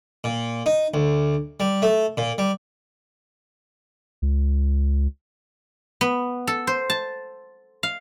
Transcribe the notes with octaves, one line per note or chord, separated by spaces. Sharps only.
A#2
D#4
D2
G3
A3
A#2
G3
C#2
B3
A4
C5
A5
F5